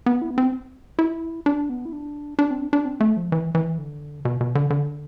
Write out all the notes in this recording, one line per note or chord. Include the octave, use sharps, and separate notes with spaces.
B3
E4
B3
C4
E4
D4
B3
E4
D4
D4
C4
D4
D4
C4
A3
F3
E3
E3
D3
B2
B2
D3
D3